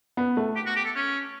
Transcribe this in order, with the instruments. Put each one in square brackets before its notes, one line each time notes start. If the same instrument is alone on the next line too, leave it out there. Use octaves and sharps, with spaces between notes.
[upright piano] B3
A3
[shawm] G4
F#4
G4
A4
C#4